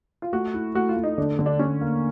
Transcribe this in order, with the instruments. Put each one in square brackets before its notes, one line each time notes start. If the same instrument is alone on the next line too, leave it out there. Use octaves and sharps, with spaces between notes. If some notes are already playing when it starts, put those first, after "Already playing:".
[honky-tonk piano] F4
[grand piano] A3 [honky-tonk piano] F#4
[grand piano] E4
[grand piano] A3 [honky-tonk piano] F#4
[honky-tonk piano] F4
[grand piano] A3
[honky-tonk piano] D#4
[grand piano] D3 [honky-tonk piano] D4
[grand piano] D3
[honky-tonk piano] D4
[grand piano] D3 [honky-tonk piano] C#4
[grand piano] A#3